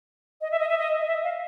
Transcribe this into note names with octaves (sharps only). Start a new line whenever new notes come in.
D#5
E5
D#5
E5
D#5
D#5
E5
F5